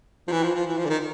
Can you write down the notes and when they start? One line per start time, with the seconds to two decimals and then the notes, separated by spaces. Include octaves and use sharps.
0.28 F3
0.32 E3
0.43 F3
0.55 F3
0.66 E3
0.78 F3
0.85 D3
0.89 D#3